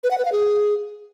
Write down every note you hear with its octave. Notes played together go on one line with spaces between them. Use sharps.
B4
F#5
B4
F5
G#4